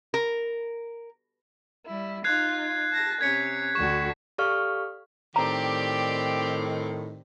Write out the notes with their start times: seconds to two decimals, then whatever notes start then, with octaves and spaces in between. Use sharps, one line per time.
0.14 A#4
1.87 G3 E4
2.24 D#4 F4 F#6 G#6 C7
2.90 A5 A#6
3.21 C3 C#4 G#6 B6 C#7
3.75 D2 D3 F#4 C#6 E7
4.38 G4 A4 D5 F5 C#6 F6
5.36 A2 D#3 C4 G4 D5 A#5